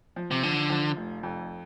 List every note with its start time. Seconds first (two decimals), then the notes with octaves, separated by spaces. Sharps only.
0.16 F3
0.31 C3
0.43 D3 F3
0.70 F3
0.96 F1
1.23 F2